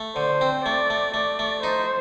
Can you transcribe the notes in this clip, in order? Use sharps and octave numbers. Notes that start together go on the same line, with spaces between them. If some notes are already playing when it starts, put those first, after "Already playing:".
Already playing: A3
D3 C5
C4
A3 D5
A3
A3 D5
A3
D#4 C5